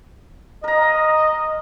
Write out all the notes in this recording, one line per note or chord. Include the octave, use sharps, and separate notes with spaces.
A#4 D#5 A#5